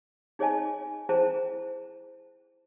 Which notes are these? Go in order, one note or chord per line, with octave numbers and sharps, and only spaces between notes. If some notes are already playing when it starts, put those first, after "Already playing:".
D#4 G#4 C#5 D#5 G#5 A5
E4 G#4 C5 G5 A5 A#5